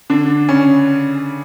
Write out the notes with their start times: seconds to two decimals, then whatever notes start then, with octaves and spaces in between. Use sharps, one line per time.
0.10 D3 D4
0.49 C#3 C#4